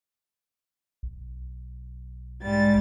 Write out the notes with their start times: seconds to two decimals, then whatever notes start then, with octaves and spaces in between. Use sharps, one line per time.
1.03 B1
2.42 G#2 G3 A6